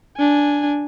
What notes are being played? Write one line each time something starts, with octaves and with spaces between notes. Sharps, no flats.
D4 G#5